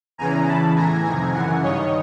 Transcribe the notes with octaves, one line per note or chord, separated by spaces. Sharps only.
E2 C#3 E3 G#5 A#5
E2 C#3 E3 A5 B5
A2 E3 G#5 A#5
F2 C3 D#3 G#5 A#5
F#2 C#3 E3 F#5 G#5
G2 D#3 C#5 D#5